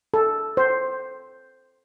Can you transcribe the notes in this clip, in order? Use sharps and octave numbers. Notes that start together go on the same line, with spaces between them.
A4
C5